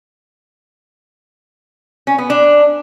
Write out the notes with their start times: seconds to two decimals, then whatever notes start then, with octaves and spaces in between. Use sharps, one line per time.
2.07 C#4
2.18 B3
2.30 D4